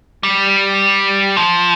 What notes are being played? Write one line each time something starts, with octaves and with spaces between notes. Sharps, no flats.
G3
F3